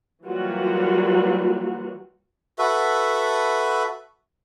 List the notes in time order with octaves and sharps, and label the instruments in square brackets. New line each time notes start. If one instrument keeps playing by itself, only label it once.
[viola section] E3 F#3 G3 A#3 F4 F#4
[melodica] F#4 A4 B4 E5